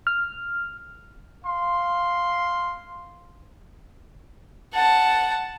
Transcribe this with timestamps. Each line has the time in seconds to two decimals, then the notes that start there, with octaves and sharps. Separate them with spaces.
0.07 F6
1.45 F5 C6
4.73 F#5 A5